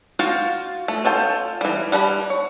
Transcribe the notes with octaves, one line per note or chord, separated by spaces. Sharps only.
F4 F#4 F5 G5
A3
C#4 F4 A4 G5
E3 G3
G3 F#5 A#5 B5
C#5